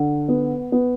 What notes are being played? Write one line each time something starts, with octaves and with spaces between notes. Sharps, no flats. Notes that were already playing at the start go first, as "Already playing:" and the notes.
Already playing: D3
B3
B3